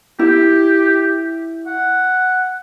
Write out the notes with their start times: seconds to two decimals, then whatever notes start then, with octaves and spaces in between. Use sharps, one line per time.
0.19 E4 G4
1.67 F#5